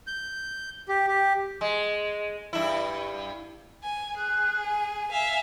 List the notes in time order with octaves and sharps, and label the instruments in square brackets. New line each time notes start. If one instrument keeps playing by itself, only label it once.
[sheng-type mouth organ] G6
G4
G4
[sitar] G#3
G2 E4
[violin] G#5
[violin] G#4 [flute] F#6
[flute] G#5
[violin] E5 F5